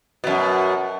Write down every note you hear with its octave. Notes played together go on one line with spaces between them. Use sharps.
F#2 B2